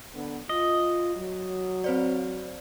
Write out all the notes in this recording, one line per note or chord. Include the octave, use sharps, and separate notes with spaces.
D3 B3
F4 D#5
F#3
C4 C5 D5